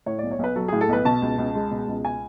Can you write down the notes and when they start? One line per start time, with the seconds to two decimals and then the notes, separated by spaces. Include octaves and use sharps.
0.06 A2 C#5
0.19 B1 D5
0.31 C#5
0.39 B1 B4
0.56 F#3 A4
0.68 A2 G#4
0.81 A4
0.89 B1 B4
1.05 B2 A5
1.22 C#2
1.38 C#2
1.55 G#3
1.71 B2
1.88 C#2
2.05 G#5